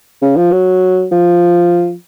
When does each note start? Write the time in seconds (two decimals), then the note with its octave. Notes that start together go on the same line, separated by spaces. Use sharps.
0.22 C#3
0.36 F3
0.52 F#3
1.11 F3